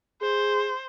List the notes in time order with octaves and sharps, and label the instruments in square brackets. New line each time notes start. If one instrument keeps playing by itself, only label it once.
[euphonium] G#4 [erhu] C5